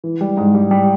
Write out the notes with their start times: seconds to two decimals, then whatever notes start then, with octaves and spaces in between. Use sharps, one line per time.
0.04 E3
0.21 G3
0.37 G#2
0.54 G3
0.71 G3